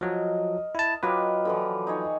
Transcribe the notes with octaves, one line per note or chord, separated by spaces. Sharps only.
F3 F#3 A#4 D#5
E4 A5
F#3 F4 G4 A#4 B4 D#5
D3 E3 F3
D#4 G#4 C#5